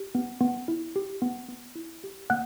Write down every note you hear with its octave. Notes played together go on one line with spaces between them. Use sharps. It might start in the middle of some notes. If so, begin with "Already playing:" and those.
Already playing: G4
B3
B3
E4
G4
B3
B3
E4
G4
A#3 F#5 F#6